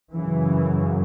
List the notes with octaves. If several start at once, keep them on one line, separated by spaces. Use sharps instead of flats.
F#2 C#3 E3